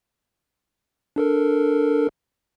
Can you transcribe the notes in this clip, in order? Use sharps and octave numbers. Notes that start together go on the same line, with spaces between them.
D4 A4 A#4